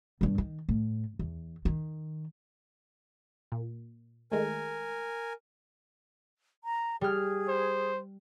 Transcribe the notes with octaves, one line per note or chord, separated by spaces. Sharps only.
G1 G2
D#3
A2
E2
D#3
A#2
D#3 G#3 A3 A#4 G#5
A#5
G3 G#4 F6
C5